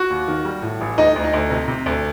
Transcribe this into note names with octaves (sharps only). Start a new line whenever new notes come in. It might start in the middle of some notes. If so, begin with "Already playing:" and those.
Already playing: F#4
D#2
D#3
G3
A2
A1
D2 D#4
D2
D#4
D2
C3
C3
D2